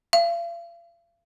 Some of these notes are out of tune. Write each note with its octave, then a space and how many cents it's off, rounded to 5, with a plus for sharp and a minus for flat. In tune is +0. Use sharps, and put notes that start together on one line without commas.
F5 -40